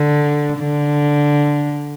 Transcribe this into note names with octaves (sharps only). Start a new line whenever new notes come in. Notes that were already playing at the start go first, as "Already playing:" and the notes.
Already playing: D3
D3